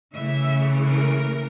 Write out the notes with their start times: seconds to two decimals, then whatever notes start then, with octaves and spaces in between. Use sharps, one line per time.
0.14 C#3 E3 A3 E5
0.87 A#4